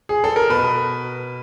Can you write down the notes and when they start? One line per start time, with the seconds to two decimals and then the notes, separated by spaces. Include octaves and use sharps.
0.09 G#4
0.24 A4
0.36 A#4
0.50 B2 B4